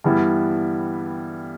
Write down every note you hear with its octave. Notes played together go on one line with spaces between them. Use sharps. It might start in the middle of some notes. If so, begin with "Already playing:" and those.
G2 E3 G3 B3 E4